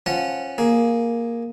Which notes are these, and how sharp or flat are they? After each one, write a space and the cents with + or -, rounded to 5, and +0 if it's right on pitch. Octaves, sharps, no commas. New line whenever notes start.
F3 +0 C#4 -15 F#5 +0
A#3 +0 G#4 +0